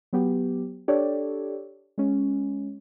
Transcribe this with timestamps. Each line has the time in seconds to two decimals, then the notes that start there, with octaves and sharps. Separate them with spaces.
0.13 F#3 B3 G4
0.88 D4 G4 A4 C#5 D5
1.98 G#3 C#4